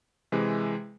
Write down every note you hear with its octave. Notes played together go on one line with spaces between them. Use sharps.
C3 E3 G#3